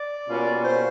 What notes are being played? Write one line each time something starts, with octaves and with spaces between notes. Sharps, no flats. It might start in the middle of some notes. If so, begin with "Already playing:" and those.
Already playing: D5
B2 G3 A#3 C#4 F4
C5